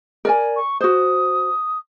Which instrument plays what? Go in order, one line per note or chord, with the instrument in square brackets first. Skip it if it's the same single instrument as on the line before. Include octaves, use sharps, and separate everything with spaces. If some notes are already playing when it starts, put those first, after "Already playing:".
[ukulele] A#4 D5 G#5
[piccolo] C#6
[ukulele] F#4 C5 [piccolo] D#6